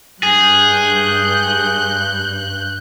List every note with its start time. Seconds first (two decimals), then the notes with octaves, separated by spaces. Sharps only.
0.23 G2 G#4 F#6 G6